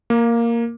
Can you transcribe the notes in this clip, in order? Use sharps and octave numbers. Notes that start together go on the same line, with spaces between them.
A#3